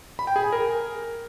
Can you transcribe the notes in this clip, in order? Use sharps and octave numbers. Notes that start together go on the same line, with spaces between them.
B5
G5
G#4
G#5
A#4